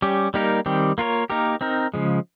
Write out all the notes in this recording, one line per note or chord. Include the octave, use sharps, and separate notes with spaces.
G3 C#4 G4
G3 A#3 D#4 G4 A#4
D#3 G3 C4 G4
A#3 F4 A#4 C#5
A#3 D#4 G4 A#4
C4 D#4 A#4
C#3 F3 G#3